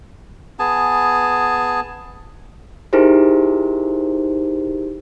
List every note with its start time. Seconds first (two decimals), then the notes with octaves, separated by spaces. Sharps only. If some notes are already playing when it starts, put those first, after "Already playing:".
0.59 B3 G#4 G#5 A5
2.93 D#4 E4 G4 G#4 A#4 C5